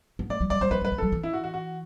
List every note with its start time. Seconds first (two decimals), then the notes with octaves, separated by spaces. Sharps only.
0.19 B3
0.30 A3 D5
0.41 F#3
0.50 G3 D5
0.61 G3 C5
0.71 F#3 B4
0.81 G3 B4
0.92 A3
0.98 F#3 A4
1.12 E3
1.23 E4
1.33 F#4
1.44 F#4
1.54 F#4